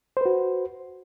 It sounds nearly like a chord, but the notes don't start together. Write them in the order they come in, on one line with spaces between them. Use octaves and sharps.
C5 B4 F#4